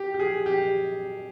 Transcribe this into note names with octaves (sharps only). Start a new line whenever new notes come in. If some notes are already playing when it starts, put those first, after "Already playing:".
Already playing: G4
G4
G#4
G4